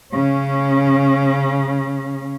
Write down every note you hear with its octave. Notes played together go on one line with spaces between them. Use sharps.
C#3 C#4